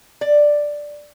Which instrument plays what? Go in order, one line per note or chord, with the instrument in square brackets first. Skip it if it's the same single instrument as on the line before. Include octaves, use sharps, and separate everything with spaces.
[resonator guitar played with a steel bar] D5